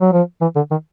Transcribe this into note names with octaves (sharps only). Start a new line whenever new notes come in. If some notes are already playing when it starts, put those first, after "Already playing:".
F#3
F3
E3
D3
D#3